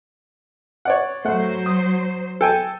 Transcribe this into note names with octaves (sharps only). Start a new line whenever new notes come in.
C#5 D5 F#5
F#3 A3 C5 F#5
D#6
A4 G5 G#5